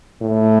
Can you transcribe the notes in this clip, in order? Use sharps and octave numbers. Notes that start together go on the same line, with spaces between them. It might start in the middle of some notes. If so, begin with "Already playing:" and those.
A2